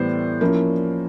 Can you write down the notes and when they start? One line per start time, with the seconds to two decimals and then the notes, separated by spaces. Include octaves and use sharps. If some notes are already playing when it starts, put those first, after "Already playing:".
Already playing: A2 E3 G3 B3 C5 D5
0.41 F3 A#3 C#4 E4